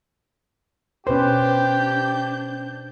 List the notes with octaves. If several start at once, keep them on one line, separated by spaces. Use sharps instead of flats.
B2 C#4 D4 G4 B4 C5 G6